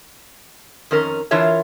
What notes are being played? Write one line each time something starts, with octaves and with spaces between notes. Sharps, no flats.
F2 D#3 C#4 A#4
E3 D4 F4 A#4 C#5 E5